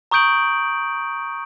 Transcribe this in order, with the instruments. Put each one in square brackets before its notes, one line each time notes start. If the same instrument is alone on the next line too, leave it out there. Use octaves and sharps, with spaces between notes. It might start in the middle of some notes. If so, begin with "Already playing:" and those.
[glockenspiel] A#5 C#6 D#6 G6 D7 F#7